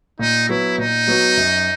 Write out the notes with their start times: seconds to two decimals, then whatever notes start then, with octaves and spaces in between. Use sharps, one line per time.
0.19 A#2 D#4
0.49 F#3 B3 E4 F#4
0.78 A#2 D#4
1.07 F#3 B3 F#4
1.37 F#2